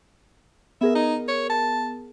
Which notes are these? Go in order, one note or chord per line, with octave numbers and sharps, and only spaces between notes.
B3 G#4 A#4 E5
D#4
C#5
A5